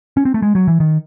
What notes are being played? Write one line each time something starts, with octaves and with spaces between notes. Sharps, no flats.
C#4
C4
A3
G#3
F#3
E3
D#3